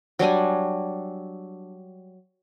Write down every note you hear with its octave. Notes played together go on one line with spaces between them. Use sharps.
F#3 G3 D4 G#5